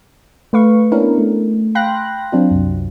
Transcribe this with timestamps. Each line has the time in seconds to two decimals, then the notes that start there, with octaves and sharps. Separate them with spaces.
0.53 A3 B4 F5 C#6
0.92 A#3 B3 C#4 D4 E4 A#4
1.18 A3
1.75 F5 G5 B5 C6 F#6 A#6
2.32 F#3 C4 D4 F4
2.51 C2 F#2